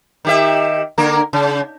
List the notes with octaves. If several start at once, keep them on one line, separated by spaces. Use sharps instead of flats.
D#3 G4 E5
D3 A#3 A#4
C#3